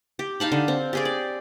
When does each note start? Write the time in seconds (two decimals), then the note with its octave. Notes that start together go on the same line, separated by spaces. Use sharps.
0.19 G4
0.40 D#4 F5 A5 B5
0.52 D3
0.68 C4
0.93 G4 G#4 D5
1.05 D5